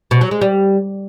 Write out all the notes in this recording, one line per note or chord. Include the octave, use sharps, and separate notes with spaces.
B2
F#3
G#3
G3